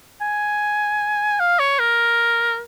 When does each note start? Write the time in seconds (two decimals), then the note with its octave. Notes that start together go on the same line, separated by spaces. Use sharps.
0.21 G#5
1.40 F5
1.59 C#5
1.79 A#4